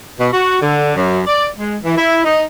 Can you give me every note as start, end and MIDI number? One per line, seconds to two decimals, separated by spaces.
0.18 0.27 47
0.32 0.58 66
0.60 0.93 50
0.95 1.20 42
1.27 1.48 74
1.56 1.77 56
1.82 1.96 52
1.97 2.23 64
2.24 2.43 63